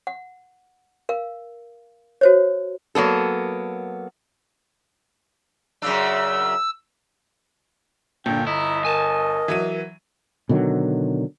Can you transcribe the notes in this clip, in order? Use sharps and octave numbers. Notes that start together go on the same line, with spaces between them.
F#5
A#4 F5
F#4 C5 C#5
F#3 A#3 B3 A4
F#2 C#3 D4 E6
G1 A#2 D4 G5
E4 D#5 A#5
A#4 G#5 A5
E3 F#3 D#7
B2 D3 D#3 F#3